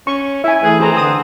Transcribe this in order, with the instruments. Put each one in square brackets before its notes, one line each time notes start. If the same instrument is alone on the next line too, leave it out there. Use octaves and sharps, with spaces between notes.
[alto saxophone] C#4 [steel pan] C#6
[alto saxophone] E4 [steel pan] E5 G#5
[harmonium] E3 A3 [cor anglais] G#4 [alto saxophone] B4
[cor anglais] C4 [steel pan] G#4 A#5
[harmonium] D3 [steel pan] D#6